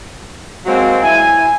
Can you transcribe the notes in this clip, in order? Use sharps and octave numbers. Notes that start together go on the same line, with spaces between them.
F#3 G#3 A#3 C4
E4 G#5